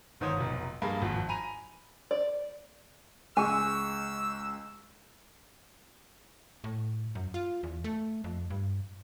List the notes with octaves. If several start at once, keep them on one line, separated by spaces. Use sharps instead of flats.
G1 G#2 D#3 C5 C#5 D#6
F1 B1
G2 A#3 G#4 B5
G#1 F2
G#5 A#5 B5 D#7 F7
D5
C#2 G#3 G#5 C#6 E6
A2
F#2
F4
E2
A3
F2
G2